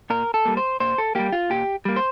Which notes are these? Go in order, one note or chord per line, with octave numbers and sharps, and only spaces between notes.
A#2 A#4
A4
G3 A#3
C5
A#2 C5
A4
G3 A#3 G4
F4
A#2 G4
G3 A#3
C5